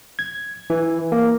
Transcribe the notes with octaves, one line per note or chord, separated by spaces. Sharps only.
G#6
E3
A#3